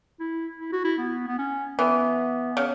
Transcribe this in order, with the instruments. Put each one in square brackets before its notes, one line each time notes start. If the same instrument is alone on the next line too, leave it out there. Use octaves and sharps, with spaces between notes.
[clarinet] E4
E4
F#4
E4
B3
B3
C#4
[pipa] E3 [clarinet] B3
[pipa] C#3